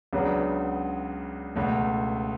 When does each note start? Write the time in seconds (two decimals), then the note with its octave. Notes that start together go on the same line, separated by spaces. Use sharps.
0.13 C#2 C#3 F#3 B3 D4
1.56 C#2 B2 A3